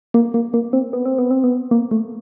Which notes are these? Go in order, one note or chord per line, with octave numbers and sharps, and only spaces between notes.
A#3
A#3
A#3
C4
B3
C4
B3
C4
B3
A#3
A3